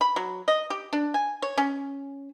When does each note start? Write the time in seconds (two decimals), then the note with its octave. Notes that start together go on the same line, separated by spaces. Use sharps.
0.01 B5
0.16 F#3
0.48 D#5
0.70 G4
0.93 D4
1.14 G#5
1.42 C#5
1.57 C#4